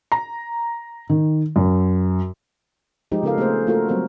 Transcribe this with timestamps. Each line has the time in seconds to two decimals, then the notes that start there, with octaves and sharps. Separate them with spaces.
0.12 A#5
1.10 D#3
1.56 F#2
3.12 F3 G#3 D#4 G4
3.23 C#3 B3 D#4 A4 A#4 F5
3.38 A3 A#3 C4 G#4 C5
3.67 A3 A#3 F4 F#4 A4 A#4
3.88 F#3 G3 A#3 C4 A#4